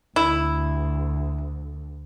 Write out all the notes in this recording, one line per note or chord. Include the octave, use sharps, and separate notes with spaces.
D2 E4